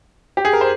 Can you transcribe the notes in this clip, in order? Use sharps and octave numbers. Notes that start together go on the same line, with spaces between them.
G4
G#4
A#4
C5